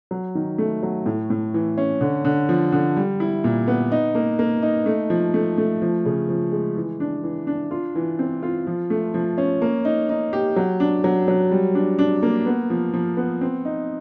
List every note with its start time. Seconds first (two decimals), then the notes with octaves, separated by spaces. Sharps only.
0.11 F#3
0.35 D#3
0.58 A3
0.83 F#3
1.06 A2
1.30 A2
1.54 E3
1.78 C#4
2.01 D3
2.25 D3
2.49 F3
2.72 D3
2.97 G3
3.20 E4
3.44 A#2
3.68 B3
3.92 D#4
4.15 A#3
4.39 A#3
4.62 D#4
4.86 A3
5.10 F3
5.34 A3
5.58 A3
5.82 F3
6.05 C#3
6.29 F3
6.52 G#3
6.76 E3
7.00 D4
7.23 E3
7.47 D4
7.71 F4
7.95 E3
8.19 C4
8.43 F4
8.67 F3
8.90 A3
9.14 F3
9.38 C#4
9.62 A#3
9.85 D#4
10.09 D#4
10.33 G4
10.56 F#3
10.80 D4
11.04 F#3
11.28 F#3
11.51 G3
11.75 D4
11.99 D4
12.23 A#3
12.46 B3
12.70 F3
12.94 F3
13.17 B3
13.41 C4
13.65 D#4